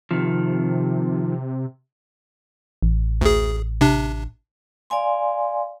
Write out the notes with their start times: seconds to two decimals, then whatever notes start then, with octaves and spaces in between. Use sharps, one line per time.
0.11 C3 D#3 F3
2.82 A1
3.21 D2 G#4
3.81 C3 D4
4.90 D5 F5 G#5 C6